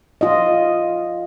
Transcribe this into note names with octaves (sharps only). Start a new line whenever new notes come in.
F4 D#5